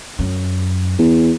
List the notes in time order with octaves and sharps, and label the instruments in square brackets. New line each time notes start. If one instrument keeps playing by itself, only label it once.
[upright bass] F#2
[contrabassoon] E2